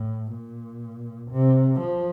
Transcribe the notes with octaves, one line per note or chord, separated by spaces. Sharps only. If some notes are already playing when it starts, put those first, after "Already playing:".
Already playing: A2
A#2
C3
F3